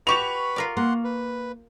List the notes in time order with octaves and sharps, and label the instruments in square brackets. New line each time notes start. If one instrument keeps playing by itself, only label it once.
[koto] F#4 G4 A5 [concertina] B4 B5 [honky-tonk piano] C#6 F7
[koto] F4 A#4 D5
[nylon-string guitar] A#3 [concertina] F#5 C6
[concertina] B4